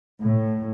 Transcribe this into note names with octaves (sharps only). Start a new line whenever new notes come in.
A2